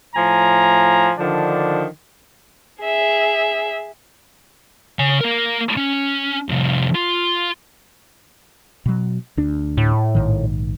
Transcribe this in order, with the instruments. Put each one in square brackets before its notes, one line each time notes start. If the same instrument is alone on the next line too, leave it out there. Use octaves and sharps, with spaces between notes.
[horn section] A2 F3 G#5 A#5
D3 D#3 F3 D4
[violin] G#4 E5
[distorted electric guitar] C#3 G#5
A#3 A#4
C#4
C2 F2
F4
[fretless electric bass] B2 F#3
D2 D4
[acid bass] A2
[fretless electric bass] A#1 G#2 D#3